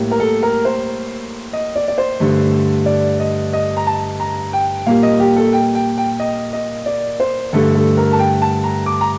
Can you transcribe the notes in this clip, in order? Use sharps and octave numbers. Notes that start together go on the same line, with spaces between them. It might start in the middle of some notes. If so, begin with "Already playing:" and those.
Already playing: A2 G3 A#3
A#4
A4
A#4
C5
D#5
D5
D5
C5
G2 D3 A3
D5
D#5
D#5
A#5
A5
A#5
G5
A#2 G3 A#3 F5
D#5
G4
A4
G5
G5
G5
D#5
D#5
D5
C5
G2 D3 A3 A4
A4
A#4
A5
G5
A5
A#5
D6
A#5